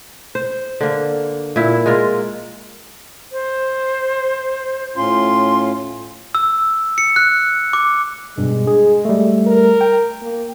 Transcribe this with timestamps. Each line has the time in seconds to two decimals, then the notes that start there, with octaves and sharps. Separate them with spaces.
0.35 C5
0.81 D3 A#3
1.56 A#2 E4
1.86 G#3 F4 A#4
3.32 C5
4.96 A2 C#4 F4 C6
6.35 E6
6.98 C#7
7.16 F#6
7.73 D6
8.38 G2 B2 G#3
8.67 G#4
9.05 G3 A3
9.47 A#4
9.81 G5
10.22 A#3